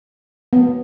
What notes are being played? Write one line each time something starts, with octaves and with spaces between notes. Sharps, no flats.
B3